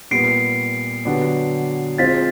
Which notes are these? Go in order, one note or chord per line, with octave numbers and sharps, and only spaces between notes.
A#2 G3 B3 C7 D7
D3 F#3 B3 D4 G4
G#3 C4 F4 A6 B6